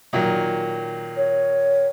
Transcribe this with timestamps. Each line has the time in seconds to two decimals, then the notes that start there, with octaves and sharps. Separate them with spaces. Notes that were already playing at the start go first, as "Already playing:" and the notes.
0.13 A#2 D#3 F#3
1.17 C#5